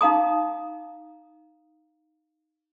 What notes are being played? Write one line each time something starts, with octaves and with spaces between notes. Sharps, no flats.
D#4 F5 A#5 D#6